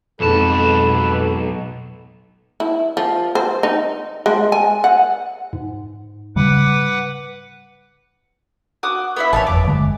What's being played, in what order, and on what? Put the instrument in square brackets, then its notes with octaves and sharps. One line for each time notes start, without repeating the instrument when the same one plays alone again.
[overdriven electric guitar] B1 A5 [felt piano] F2 G#2 [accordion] A4 B4
[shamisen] E4
F3
C5
D#4
G#3
G#5
F#5
[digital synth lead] G#2
[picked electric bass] C#3 G3 [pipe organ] B4 F#5 D6
[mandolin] F#4 D6 D#6
B3 E4 E5
[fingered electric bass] A1 [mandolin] C#5 F#5 A5
[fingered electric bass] G1 F2 [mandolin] D6
[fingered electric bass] G2 D3 G#3